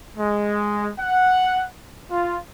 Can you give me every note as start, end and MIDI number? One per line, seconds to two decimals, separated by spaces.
0.17 0.91 56
0.99 1.67 78
2.11 2.38 65